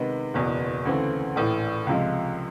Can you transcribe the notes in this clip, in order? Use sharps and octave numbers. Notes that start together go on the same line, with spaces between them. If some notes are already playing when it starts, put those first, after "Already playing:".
Already playing: C3 D#3 G#3 B3
F#1 E2 B2
D2 C#3 E3 A3 C4
A#1 A2 E3
C#2 C3 F3 G#3